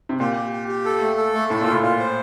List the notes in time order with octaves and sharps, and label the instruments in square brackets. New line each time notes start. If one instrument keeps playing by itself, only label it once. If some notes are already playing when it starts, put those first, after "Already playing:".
[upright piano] C3
[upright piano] A#2 [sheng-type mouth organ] G4
[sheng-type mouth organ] G4
G4
G4
A4
A3
A4
A3
[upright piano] A2 [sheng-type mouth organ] A4
[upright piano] A#2
[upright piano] A2 [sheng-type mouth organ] F4
[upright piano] A#2 [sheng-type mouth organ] F4
[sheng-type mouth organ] C5